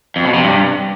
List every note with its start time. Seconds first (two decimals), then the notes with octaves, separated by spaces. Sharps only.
0.16 F2
0.25 B2
0.34 C3
0.43 G2